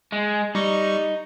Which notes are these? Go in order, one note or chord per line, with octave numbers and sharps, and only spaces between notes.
G#3
G3 D#4 C#6